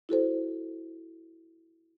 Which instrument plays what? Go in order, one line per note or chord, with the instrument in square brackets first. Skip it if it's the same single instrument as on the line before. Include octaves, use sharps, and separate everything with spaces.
[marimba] E4 F#4 A4 C5